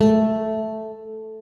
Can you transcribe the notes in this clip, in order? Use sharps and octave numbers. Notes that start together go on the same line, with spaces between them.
A3